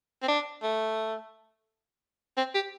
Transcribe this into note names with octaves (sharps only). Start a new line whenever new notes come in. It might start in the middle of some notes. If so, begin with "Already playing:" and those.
C4
D4
A3
C4
G4